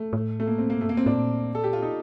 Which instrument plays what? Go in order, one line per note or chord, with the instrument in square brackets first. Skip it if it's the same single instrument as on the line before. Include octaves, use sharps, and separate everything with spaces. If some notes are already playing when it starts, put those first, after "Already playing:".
Already playing: [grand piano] A3
[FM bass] A2
[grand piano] A3
A#3
C4
A#3
[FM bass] G2 [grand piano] A3
[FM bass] F2 [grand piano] A#3
[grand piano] C4
[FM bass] A2 [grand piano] D4
[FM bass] A#2
[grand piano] A4
G4
F4
D#4